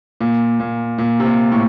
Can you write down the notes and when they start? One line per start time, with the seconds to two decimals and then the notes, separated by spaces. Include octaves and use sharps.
0.21 A#2
0.60 A#2
0.98 A#2
1.20 C3
1.25 A#2
1.52 A2